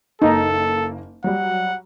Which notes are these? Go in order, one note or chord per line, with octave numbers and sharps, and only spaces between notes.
F#1 A#3 D#4 A4
F#3 G3 F#5